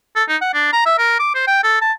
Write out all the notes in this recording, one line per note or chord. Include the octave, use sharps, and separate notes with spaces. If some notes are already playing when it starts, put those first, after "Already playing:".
A4
D#4
F#5
D4
A#5
E5
A#4
D6
C5
G5
A4
A5